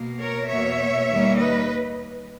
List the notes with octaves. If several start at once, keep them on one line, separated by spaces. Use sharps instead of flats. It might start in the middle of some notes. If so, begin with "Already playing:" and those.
Already playing: B2 A#3
A#4 C#5
E2 B2 A#3 C#5 E5
D#2 D#3 G3 A#3
B4 D#5